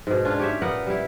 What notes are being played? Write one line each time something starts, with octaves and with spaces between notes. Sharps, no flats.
G#2 B2
C#4 D4 F4
G4 C#5 E5
A#2 B3 A#4 F#5
G3 E4